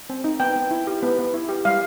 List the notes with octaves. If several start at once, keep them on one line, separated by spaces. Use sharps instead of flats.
C4
D#4
B3 G5
B3
E4
G4
B3
B3
E4
G4
G3 F5